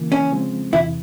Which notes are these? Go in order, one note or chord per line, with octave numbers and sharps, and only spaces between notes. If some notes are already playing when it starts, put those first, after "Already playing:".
Already playing: C#3 E3 A#3
C#4
C#3 F3 G#3 C4
E2 C3 E3 E4